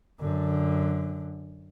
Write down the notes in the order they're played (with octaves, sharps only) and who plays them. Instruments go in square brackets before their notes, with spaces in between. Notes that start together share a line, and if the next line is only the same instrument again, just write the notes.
[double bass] F#2 D3